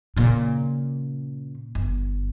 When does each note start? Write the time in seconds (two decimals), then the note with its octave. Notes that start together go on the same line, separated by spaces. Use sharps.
0.16 A#2 C#3
1.75 G1